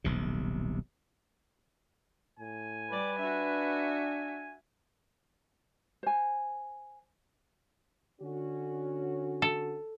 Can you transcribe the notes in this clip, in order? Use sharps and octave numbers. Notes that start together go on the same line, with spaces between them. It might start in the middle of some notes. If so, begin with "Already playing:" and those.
D#1 B1 C3
A2 G#5
G3 B4 D5
D4 F#4 E5
C5 G#5
D3 C#4 F#4
A4